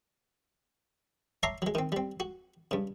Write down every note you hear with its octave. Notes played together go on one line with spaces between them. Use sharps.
C#5 E5 A5 A#5 C6 D6
F#3 G#3
D#3 C4
G3 C4
F#4
G2 C#3